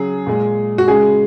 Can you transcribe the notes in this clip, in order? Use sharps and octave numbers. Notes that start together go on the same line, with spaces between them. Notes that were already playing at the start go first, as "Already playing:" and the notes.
Already playing: C#3 F#3 G#4
A#2 G#3
F#4
C#3 G#3 G#4